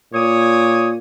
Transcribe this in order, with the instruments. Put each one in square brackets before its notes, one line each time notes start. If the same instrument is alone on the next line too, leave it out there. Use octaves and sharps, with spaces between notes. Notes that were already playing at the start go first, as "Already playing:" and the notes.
[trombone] A#2 [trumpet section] C#5 D6 D#6